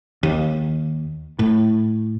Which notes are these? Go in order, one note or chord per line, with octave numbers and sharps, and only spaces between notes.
D#2
A2